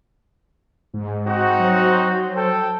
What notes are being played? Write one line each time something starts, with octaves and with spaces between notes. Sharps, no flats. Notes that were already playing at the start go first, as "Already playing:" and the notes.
G#2
C4 D#4 F#4
F#3 C5
A4 G5